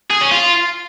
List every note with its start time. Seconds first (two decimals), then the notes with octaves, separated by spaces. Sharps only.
0.11 G#4
0.21 C#4
0.31 F4